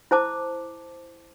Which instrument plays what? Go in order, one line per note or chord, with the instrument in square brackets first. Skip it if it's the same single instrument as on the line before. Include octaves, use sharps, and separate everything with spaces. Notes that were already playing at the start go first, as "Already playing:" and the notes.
[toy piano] E4 C5 A5 D6